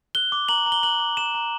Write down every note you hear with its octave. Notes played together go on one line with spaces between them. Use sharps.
F#6 G7
D6
A#5 F#7
A#5
G7
F#6 F#7
D6
A#5 E7
A#5